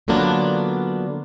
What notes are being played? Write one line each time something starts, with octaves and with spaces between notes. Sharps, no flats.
D3 F#3 A#3 B3 D4 F4